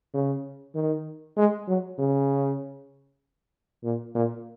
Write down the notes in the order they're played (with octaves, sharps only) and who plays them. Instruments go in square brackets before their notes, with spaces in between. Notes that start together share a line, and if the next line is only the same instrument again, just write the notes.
[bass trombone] C#3
D#3
G#3
F#3
C#3
A#2
A#2